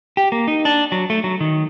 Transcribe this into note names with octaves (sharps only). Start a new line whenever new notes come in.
G4
A#3
D#4
D4
F#3
A3
F#3
D#3